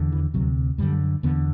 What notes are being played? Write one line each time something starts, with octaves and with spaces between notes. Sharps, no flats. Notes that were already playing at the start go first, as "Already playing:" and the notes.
Already playing: E2 D3
E3
D2 C3 F#3
F#2 D3 G3
E2 D3 B3